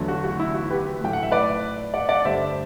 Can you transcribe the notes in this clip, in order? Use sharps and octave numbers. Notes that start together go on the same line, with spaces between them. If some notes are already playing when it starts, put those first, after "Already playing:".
Already playing: E2 D3 F#3 A3
F#4
F#4
E4
F#4
G4 B4
A2 F#3 A3 G5
F#5
E5
B4 D5
D5 F#5
D5 F#5
G2 D3 A3 C5 E5